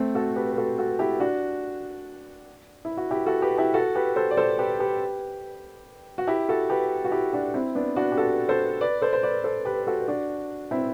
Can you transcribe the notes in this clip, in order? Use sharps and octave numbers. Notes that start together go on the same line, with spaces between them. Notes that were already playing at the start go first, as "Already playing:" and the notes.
Already playing: A3 C4
F#4 A4
G4 B4
B4
F#4 A4
F#4 A4
E4 G4
D4 F#4
E4
F#4
E4 G4
F#4 A4
G4 B4
E4 G4
F#4 A4
G4 B4
A4 C5
D5
A4 C5
G4 B4
G4 B4
F#4
E4 G4
F#4 A4
G4 B4
F#4
E4 G4
D4 F#4
C4 E4
B3 D4
D4 F#4
G4
F#4 A4
A4 C5
B4 D5
A4 C5
C5
B4 D5
A4 C5
G4 B4
F#4 A4
D4 F#4
C4 E4